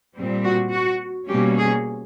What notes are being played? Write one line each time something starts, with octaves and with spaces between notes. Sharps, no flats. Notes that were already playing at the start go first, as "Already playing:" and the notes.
A#2 G3 C4
F#4
F#4
B2 G3 A#3 C#4 G4
G#4